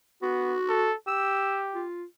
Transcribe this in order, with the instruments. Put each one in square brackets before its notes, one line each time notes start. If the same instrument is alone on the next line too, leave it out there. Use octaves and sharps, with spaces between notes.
[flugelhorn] B3 [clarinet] F#4
[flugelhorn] A4
[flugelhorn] G4 [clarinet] E6
[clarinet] F4